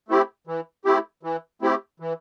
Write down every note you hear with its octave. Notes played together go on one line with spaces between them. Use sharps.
A3 C4 E4 G4
E3
A3 C4 E4 G4
E3
A3 C4 E4 G4
E3